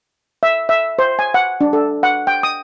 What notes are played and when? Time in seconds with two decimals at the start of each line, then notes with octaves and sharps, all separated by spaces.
0.43 E5
0.69 E5
0.99 C5
1.19 G#5
1.34 F#5
1.61 D4
1.73 A4
2.03 F#5
2.27 G5
2.43 D#6